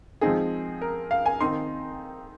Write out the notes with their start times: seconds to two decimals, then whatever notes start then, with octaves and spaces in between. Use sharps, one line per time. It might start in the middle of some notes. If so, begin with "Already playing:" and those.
0.21 F3 G#3 C4 D#4 G#4
0.81 A#4
1.11 F5
1.26 G#5
1.41 D#3 C4 D#4 C6